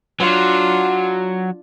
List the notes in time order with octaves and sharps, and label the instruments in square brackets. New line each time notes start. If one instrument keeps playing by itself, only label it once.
[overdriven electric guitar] F#3 [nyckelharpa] D4 F4